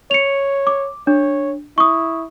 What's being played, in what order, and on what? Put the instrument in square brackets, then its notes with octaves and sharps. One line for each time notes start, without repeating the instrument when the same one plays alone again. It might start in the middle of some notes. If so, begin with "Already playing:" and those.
[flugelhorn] C#5 [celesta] C#7 F7
[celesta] D6
[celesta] D4 [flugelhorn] C#5
[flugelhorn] E4 [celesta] C#6 D#6